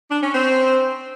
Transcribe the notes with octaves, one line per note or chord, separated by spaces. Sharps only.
D4
C#4
C4